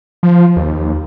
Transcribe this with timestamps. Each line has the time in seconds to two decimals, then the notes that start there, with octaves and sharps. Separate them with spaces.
0.23 F3
0.56 D#2